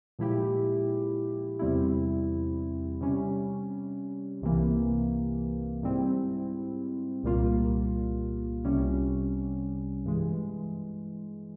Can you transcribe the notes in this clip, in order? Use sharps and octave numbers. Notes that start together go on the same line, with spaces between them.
A#2 F3 G#3 E4 G4
E2 C3 G3 C4 E4
C3 G3 C#4
C2 C3 E3 A#3
G#2 G3 C4 E4
C2 A#2 G3 A#3 F4
C2 C3 G3 C#4
G2 E3 G#3